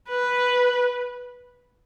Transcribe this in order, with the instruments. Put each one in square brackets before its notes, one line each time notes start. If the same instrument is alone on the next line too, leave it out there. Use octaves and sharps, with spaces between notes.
[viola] B4